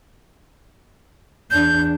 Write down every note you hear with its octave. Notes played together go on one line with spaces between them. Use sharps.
E2 D4 G6